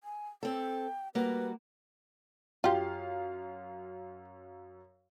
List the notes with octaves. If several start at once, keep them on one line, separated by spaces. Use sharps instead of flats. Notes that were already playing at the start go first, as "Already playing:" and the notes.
G#5
C4 A4 G5
G3 A#3 F#4 B4
F#2 F4 G4 F5